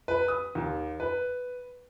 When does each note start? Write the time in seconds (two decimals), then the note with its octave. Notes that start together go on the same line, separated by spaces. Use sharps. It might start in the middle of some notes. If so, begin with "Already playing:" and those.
0.08 B4
0.28 D#6
0.55 D#2
1.00 B4